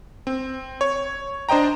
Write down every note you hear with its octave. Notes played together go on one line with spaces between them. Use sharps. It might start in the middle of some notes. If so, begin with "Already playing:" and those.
C4
C#5
D4 C5 D#5 G5 A#5